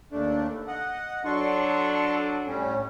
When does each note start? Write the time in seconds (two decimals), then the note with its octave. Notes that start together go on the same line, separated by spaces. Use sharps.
0.12 D#2 A3 D4
0.68 D#5 F#5
1.25 F#3 D4 A4 C6 C#6
2.47 A2 G3 C#4